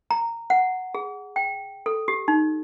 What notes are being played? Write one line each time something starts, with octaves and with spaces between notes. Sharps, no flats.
A#5
F#5
G#4
G5
A4
G4
D#4